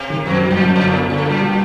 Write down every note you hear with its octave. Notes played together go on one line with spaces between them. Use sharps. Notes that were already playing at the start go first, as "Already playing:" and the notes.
Already playing: C3
D#3
F#2 B2
G3
A#2
F#2
A#2 D3
A2
B3
A2 D3
A#2 G3
G3